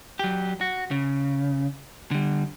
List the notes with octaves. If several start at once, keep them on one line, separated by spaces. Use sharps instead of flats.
F#3 G4
F#4
C#3
D3 G3